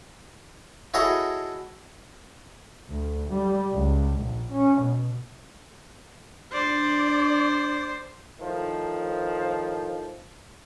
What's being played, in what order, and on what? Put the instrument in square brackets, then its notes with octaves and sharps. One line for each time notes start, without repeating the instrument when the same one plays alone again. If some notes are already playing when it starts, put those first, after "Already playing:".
[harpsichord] E4 F#4 G#4 A4 C#5 D#5
[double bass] D2
G3
C#2
A#1
C#4
B2
[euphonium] D4 [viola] C5 [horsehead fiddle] D5
[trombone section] A2 D#3 F3